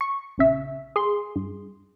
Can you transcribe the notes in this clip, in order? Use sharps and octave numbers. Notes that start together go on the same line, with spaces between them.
C#6
A#1 C#3 E5
G#4 C6
G2